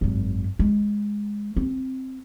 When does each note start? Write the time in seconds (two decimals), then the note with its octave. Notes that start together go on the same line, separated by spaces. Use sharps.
0.01 G#1 F#2
0.59 G#3
1.56 C4